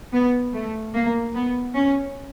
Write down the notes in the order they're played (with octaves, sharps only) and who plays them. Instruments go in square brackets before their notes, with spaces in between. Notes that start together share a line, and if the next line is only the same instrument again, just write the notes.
[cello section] B3
A3
A#3
B3
C#4